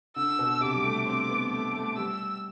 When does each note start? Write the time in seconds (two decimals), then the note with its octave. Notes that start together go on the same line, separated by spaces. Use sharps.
0.16 D3 E6
0.39 B2
0.61 C3 D6
0.75 G3
0.83 A3
1.06 C4 D6
1.29 B3
1.51 A3 D6
1.73 A3
1.96 G3 E6